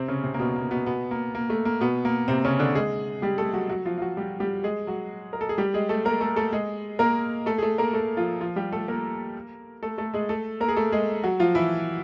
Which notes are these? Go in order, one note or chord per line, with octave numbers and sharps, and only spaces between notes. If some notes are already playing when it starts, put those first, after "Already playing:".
Already playing: C3 C4
C#3 C#4
C3 C4
A#3
B2 B3
A#3
B2 B3
B2 B3
A#3
A#3
A3
A#3
B2 B3
A#3
C3 C4
C#3 C#4
D3 D4
G#3 G#4
G3 G4
A3 A4
F#3 F#4
F#3 F#4
F3 F4
F4
F#3 F#4
G3 G4
G3 G4
G#3 G#4
F#3 F#4
A#4
A4
G#4
G3 G4
G#3 G#4
A3 A4
A#3 A#4
A3 A4
A3 A4
G#3 G#4
A#3 A#4
A3 A4
G#4
A3 A4
A#3 A#4
A3 A4
F3 F4
F3 F4
G3 G4
A3 A4
A#3 A#4
A3 A4
A3 A4
G#3 G#4
A3 A4
A#3 A#4
G#4
A3 A4
G#3 G#4
F#3 F#4
F3 F4
E3 E4